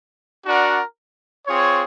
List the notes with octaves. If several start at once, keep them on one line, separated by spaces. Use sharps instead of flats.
D4 F#4 A#4 D5 F#5
C4 F4 G#4 C#5